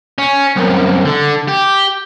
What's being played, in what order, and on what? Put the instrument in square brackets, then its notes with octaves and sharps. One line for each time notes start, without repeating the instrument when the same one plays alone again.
[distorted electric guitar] C#4
C2 F#2
D3
G4